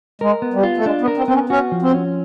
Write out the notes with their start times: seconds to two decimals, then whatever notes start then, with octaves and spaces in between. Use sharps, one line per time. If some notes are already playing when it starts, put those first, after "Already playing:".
0.21 G#3 A#4
0.42 B3
0.54 G3
0.63 F4
0.77 A3
0.86 G#3 D4
1.01 B3
1.08 A#4
1.17 C4
1.28 B3 C4
1.34 C#4
1.49 C#4 F#4
1.72 F3
1.82 C4
1.93 C#4